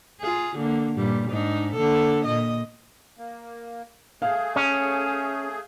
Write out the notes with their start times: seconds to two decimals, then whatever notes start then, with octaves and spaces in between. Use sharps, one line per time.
0.21 F4 G#4
0.56 D3 A#3
0.96 G2 A#2 G3
1.29 G#2 D4 D#4
1.74 D3 A#3 A4
2.25 A#2 D#5
3.18 A#3
4.22 A3 G#4 F5
4.56 C#4